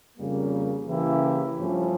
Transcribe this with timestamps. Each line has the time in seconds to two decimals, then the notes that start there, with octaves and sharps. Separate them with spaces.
0.18 F2 C#3 G3 A#3
0.88 C#3 E3 A#3 E4 G4
1.58 G2 F3 A3 C#4 E4